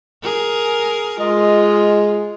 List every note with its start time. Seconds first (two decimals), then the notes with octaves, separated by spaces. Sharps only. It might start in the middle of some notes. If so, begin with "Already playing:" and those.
0.22 G#4 A#4
1.20 G#3 F4 D#5